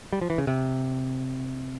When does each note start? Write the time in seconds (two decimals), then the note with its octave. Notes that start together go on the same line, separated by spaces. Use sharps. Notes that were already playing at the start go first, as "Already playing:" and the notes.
0.13 G3
0.21 F3
0.30 E3
0.38 C#3
0.47 C3